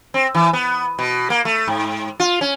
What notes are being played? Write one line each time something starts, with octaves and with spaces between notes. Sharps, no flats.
C4
E3
B3
B2
A#3
A3
G#2
F4
C#4